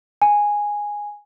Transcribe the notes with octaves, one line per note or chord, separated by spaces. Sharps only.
G#5